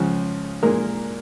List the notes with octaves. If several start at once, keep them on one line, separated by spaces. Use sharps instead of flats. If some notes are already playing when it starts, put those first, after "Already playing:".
Already playing: C#2 C#3 F3
A#2 G#3 A#4